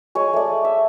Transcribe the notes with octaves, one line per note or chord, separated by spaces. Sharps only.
G#3 C#5 G#5
A3 D5
E5